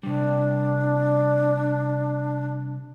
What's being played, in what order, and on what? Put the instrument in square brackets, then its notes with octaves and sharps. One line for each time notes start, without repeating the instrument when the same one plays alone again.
[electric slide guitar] C3 G3 [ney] D4